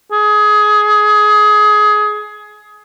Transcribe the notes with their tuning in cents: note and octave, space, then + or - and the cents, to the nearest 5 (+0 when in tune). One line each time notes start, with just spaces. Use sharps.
G#4 +20